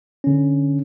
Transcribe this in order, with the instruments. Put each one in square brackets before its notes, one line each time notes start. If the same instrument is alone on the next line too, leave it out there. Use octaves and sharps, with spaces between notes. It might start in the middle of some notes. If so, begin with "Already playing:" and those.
[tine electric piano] D3 C#4